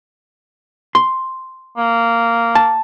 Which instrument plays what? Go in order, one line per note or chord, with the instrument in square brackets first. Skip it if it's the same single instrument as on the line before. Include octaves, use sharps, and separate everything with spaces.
[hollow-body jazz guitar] C6
[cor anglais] A#3
[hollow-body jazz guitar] A5